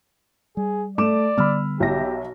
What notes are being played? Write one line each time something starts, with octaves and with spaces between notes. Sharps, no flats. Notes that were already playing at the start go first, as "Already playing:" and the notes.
G3 G#4
A3 D5 D6 E7
D3 G3 B3 B5 E6 F6
B1 G4 E5 A#6